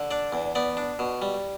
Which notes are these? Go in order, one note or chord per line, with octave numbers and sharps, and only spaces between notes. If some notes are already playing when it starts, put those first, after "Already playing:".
Already playing: D3
D4 D5
E2
B3 D5
D4
B2
G3